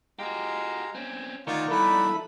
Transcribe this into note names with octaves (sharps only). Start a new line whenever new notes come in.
G#3 F#4 G4 F5 A#5
C4 C#4 G#5
D2 D#3 D#4 F4 A#4 D5 F#5 C#6
E2 G2 E4 A4 B4 B5